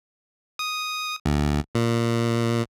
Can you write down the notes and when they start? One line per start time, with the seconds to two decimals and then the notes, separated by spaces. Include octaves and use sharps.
0.59 D#6
1.25 D2
1.75 A#2